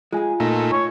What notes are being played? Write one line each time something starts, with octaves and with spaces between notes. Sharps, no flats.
G#3 F4 G#4 G#5
A#2 A3 D#4
C#5